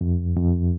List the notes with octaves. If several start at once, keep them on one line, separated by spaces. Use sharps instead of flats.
F2
F2